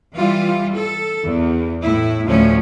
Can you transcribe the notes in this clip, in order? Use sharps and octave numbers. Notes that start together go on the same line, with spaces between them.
E3 G3 F4
A4
E2
A2 E4
D2 A2 F3 A3 C#4